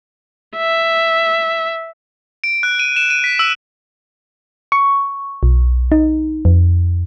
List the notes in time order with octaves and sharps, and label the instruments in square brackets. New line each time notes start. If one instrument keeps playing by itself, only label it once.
[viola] E5
[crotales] D7
F#6
D#7
E7
D#7
B6
E6
[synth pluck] C#6
B1
D#4
F2